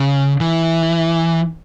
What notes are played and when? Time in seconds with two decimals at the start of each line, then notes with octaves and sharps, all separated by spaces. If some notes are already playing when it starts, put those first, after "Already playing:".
Already playing: C#3
0.40 E3